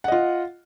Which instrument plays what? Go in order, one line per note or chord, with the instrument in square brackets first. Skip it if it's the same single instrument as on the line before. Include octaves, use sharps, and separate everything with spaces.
[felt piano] F#5
D#5
F4